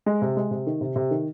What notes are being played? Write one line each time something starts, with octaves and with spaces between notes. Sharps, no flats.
G#3
C3
G#3
C3
D#3
C3
C3
D#3